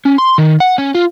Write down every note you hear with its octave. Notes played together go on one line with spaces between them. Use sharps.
C#4
C6
D#3
F#5
C#4
F4